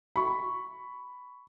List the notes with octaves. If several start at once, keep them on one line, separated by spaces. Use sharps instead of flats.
B5 C#6